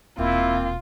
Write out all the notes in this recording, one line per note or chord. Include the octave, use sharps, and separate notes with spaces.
D#1 B2 A#3 C4 E4 F4